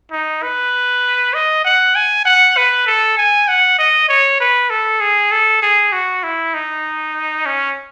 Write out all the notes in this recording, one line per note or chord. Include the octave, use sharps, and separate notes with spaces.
D#4
B4
D#5
F#5
G#5
F#5
B4
A4
G#5
F#5
D#5
C#5
B4
A4
G#4
A4
G#4
F#4
E4
D#4
C#4